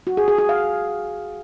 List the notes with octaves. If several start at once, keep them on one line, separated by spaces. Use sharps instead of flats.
F#4
G#4
G#4
G#4
F5